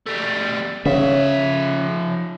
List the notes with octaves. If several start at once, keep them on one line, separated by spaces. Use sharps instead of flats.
G3 A3
C#3 F3 E5